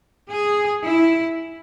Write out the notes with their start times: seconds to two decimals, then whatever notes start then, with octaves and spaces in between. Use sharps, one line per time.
0.30 G#4
0.85 E4